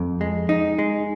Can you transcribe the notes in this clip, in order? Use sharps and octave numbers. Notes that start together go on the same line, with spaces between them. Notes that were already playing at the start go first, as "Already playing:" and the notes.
Already playing: F2
G#3
D#4
G#3